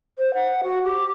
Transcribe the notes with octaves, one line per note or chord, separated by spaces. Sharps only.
C5
F#5
F#4
G4